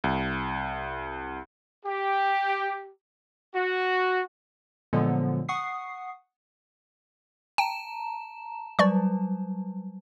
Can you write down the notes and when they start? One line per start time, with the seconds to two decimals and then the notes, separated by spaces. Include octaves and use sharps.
0.04 C2
1.86 G4
3.55 F#4
4.93 A#2 D3 F3 F#3 G#3 B3
5.49 F#5 C#6 D#6 C7
7.58 G5 A5 A#5 E7
8.79 F#3 G3 D5 C#6